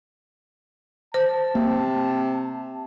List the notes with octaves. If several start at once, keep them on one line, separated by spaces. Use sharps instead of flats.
C5 A5
C3 A#3